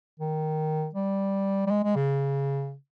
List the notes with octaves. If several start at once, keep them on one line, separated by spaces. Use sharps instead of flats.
D#3
G3
G3
G#3
G#3
C#3